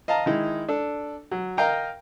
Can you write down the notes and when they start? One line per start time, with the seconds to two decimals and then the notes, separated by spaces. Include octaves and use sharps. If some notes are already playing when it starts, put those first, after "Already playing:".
0.08 D#5 F5 A5 A#5
0.26 D#3 G#3 D#4 E4
0.68 D4 A4
1.31 F#3
1.57 A#4 D#5 F5 G5 A#5